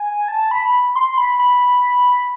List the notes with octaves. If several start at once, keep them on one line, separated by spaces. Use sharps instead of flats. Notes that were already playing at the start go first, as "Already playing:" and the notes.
Already playing: G#5
A5
B5
C6
B5
B5